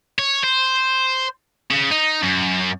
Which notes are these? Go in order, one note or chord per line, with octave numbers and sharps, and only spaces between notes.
C#5
C5
C#3
D#4
F#2